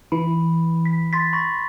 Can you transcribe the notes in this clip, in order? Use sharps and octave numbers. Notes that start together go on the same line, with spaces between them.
E3 B5
B6
C6 A6 B6
B5 C#6 A#6